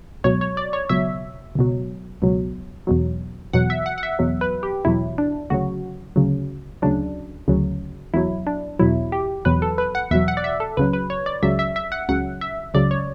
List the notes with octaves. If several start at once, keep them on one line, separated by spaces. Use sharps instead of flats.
C#2 B2 F#3 C#5
C#5
D5
C#5
C#2 B2 F#3 E5
C#2 B2 F#3
C#2 B2 F#3
E2 B2 F#3
E2 B2 F#3 F#5
E5
F#5
F#5
E5
E2 B2 F#3
B4
G4
E2 B2 F#3 E4
D4
D2 C#3 F#3 F#4
D2 C#3 F#3
D2 C#3 F#3 D4
D2 C#3 F#3
E2 B2 F#3 E4
D4
E2 B2 F#3 E4
G4
E2 B2 F#3 B4
A4
B4
F#5
E2 B2 F#3 E5
F#5
D5
E5
A4
C#2 C#3 F#3 B4
B4
C#5
D5
C#2 C#3 F#3 E5
E5
E5
F#5
C#2 C#3 F#3 F#5
E5
C#2 C#3 F#3 D5
C#5